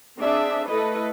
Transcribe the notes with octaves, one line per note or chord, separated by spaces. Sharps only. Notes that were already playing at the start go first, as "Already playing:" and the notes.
C4 D4 G#4 D5 E5
A3 E4 A4 B4 D#5